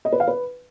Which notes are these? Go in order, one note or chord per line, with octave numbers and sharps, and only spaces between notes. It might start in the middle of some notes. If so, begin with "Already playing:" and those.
D#5
B4
F5
B4